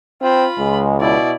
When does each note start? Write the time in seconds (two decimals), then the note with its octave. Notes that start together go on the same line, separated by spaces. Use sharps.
0.22 C4 F4 B5
0.58 C#2 G#3
1.00 B2 E4 D5